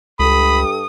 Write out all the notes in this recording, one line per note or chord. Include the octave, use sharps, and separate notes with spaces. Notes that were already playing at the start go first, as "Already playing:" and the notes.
C#2 G2 G4 A4 B5 D#6